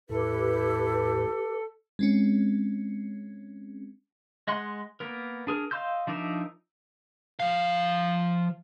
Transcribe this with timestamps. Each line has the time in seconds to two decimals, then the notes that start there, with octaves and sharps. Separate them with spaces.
0.09 E2 A2 E4 G4 A4 B4
1.99 G#3 C4 C#4
4.47 G#3 D#5 F#5 C6
5.00 A#3 B3 A#4
5.47 D4 G#4 A#4
5.71 D#5 F5 C6 E6 G6
6.07 F3 D4 D#4 A#4 E5
7.40 F3 F5